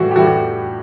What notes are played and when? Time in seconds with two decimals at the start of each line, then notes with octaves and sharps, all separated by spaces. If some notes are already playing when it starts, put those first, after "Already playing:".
Already playing: A2 E3 G3 F#4
0.11 G4
0.16 A2 E3 G3 F#4
0.27 F#4